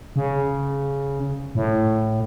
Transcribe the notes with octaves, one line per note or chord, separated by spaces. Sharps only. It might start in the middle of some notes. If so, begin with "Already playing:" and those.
C#3
A2